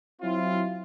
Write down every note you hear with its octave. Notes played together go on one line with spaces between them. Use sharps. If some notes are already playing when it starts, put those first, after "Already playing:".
F#3 C4 E4 F4